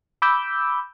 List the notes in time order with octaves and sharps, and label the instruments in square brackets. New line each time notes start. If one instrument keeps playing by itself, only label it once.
[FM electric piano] B5 D6 E6 G6